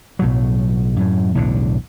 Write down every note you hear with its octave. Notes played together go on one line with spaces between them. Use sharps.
B1 A2 F#3
F#2 A2
B1 E2 A2 D3